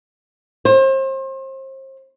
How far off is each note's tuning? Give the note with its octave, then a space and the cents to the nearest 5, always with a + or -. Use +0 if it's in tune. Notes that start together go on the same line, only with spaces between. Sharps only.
C5 +35